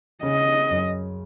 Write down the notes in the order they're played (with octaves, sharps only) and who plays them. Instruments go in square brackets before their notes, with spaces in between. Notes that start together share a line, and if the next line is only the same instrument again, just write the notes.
[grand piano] C#3 [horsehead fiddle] D#5
[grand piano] F#2